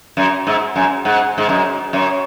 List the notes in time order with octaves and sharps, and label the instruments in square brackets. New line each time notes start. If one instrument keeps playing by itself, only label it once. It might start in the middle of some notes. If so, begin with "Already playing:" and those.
[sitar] F#2
[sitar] G#2 [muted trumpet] E5
[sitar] F#2 [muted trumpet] G#5
[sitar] G#2 [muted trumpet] F#5
[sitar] G#2
[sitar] F#2 [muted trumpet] D#5
[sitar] F#2 [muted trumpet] C#5